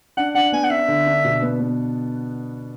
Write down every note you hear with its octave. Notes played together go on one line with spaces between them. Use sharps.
D4 F#5
D4 F#5
B3 G#5
F#5
D4 E5
D3
D4
B2
B3
B3